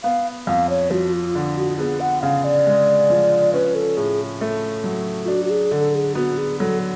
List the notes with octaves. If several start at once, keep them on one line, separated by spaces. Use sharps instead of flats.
B3 F5
F2 F5
C#5
F3 F#4
F4
D3
F#4
B3 G#4
F#5
C#3 F5
D5
G#3
F3
C#4 B4
A4
A2 G#4
A3
F#3
F4
D4 F#4
F#4
G#4
D3 A4
G#4
B3 F#4
G#4
F#3 A4